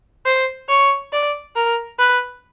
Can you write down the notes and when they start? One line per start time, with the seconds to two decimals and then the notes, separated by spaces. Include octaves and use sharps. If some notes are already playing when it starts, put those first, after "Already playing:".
0.26 C5
0.69 C#5
1.13 D5
1.56 A#4
1.99 B4